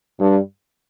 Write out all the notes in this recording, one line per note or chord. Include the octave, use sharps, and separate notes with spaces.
G2